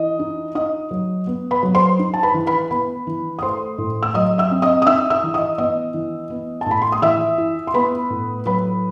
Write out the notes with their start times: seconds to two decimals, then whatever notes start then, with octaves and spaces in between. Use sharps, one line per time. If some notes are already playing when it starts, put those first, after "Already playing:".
Already playing: E3 D#5 D#6
0.19 D#4
0.55 D#4 D#5 D#6
0.91 F#3
1.27 B3
1.51 B4 B5
1.63 F#3
1.75 C5 C6
1.99 D#4
2.14 A5
2.23 B4 B5
2.34 E3
2.46 B4 B5
2.71 B3 B4 B5
3.07 E3
3.39 D#6
3.42 A3 C5 C6
3.78 A2
4.03 E6
4.14 F#3 D#5 D#6
4.38 E5 E6
4.51 C4
4.62 D#5 D#6
4.82 D#6
4.86 D#4 E5 E6
5.10 E5 E6
5.23 E3
5.34 D#5 D#6
5.58 B3 D#5 D#6
5.94 E3
6.30 B3
6.61 A2 A5
6.71 B5
6.82 C6
6.92 D#6
7.02 E3 E5 E6
7.38 E4
7.67 C6
7.74 B3 B4 B5
8.10 A2
8.46 F#3 B4 B5